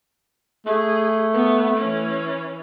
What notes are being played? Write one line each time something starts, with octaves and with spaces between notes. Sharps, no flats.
A3 G#4
B3
E3 C#4